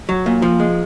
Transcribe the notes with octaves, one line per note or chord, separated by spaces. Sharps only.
F#3
A#2
F3
G#3